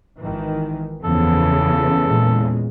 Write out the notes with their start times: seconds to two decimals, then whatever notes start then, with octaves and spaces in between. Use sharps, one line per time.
0.22 G#1 D#3 E3
1.04 F#1 E2 C#3 F3 A4
2.05 A#2 G#3